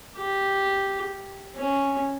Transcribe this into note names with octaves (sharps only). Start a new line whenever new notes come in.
G4
C#4